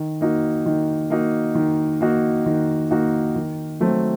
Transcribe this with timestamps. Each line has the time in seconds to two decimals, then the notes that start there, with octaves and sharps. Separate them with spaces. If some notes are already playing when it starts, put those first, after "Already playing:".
Already playing: D#3
0.21 A#3 D#4 F#4
0.66 D#3
1.10 A#3 D#4 F#4
1.55 D#3
2.01 A#3 D#4 F#4
2.46 D#3
2.91 A#3 D#4 F#4
3.36 D#3
3.80 F#3 A3 C4